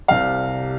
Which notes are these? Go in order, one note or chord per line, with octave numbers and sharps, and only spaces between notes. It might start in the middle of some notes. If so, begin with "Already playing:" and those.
C2 C3 G3 F5